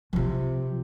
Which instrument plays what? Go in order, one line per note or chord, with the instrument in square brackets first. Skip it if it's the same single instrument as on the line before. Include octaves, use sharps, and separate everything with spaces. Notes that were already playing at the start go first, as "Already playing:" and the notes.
[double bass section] C3 [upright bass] F3 F4